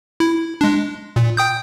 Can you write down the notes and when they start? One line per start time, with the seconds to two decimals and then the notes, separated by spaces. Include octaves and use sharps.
0.20 E4
0.61 G#3 D4
1.16 A#2
1.37 G5 D#6 G6